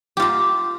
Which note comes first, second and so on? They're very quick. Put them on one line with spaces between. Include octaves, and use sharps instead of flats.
G4 F4 A#5